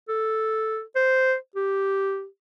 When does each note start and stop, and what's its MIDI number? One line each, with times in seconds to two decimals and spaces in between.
0.08 0.81 69
0.95 1.35 72
1.56 2.26 67